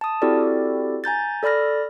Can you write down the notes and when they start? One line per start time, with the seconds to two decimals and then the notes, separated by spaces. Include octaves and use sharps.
0.01 A5 D#6
0.22 C4 E4 F#4 G4 A4 D5
1.04 G#5 A#5 G6 A6
1.43 A4 D5 B5 F6 A#6